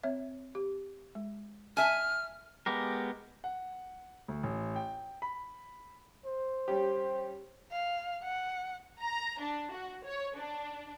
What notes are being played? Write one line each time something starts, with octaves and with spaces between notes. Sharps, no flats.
C4 C#5 E5
G4
G#3
E5 G#5 F6
G#3 B3 G4 A#4
F#5
D2
A1
G5
B5
C5
G3 C#4 G4
F5
F#5
A#5
D4
F#4
C#5
D4